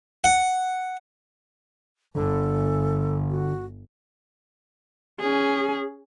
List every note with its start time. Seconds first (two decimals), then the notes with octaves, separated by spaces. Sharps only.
0.24 F#5
2.15 G1 D3 A4
3.30 F#4
5.20 C#4 G#4